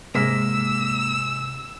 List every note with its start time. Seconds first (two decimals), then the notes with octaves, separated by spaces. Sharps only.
0.15 G#2 C3 G#3 A#3 E6 B6